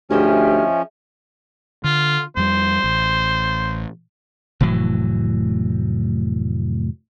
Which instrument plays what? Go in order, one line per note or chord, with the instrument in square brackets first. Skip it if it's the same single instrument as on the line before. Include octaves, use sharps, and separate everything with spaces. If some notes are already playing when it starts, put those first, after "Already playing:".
[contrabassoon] D2 [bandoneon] F3 C#4 [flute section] G4 F6 [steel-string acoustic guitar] G#4 D#5 E5
[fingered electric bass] D3 [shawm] F4
[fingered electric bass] F2 G3 [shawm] C5
[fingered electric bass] A1
[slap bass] F1 A2 E3 F#3